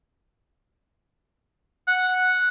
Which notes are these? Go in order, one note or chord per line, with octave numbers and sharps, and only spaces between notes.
F#5